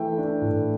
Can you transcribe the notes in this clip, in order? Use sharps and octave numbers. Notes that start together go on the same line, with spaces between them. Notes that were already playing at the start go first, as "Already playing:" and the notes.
Already playing: E3 A3 E5 G5
D4
A2